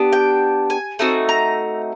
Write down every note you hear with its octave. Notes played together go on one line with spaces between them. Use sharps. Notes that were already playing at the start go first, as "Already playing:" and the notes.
Already playing: B3 D4 G4
G5
G#5
A3 C4 D#4 F#4
A#5